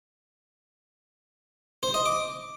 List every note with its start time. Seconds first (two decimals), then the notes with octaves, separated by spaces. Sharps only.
1.83 C5
1.94 D#5
2.05 D6